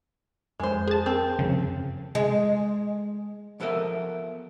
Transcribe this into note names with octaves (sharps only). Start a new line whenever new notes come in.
F2 G#3 C5
G#4 A5
C4 A#4
F#2 C#3 F3
G#3
F3 B3 A4 A#4 E5